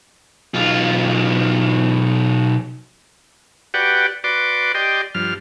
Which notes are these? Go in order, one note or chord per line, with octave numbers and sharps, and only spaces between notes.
B1 F4
F#4 G4 B4 D5 F#5 G5
F#4 B4 D5 C6 D6
G4 D5 D#5 G5 C6
G2 F3 F6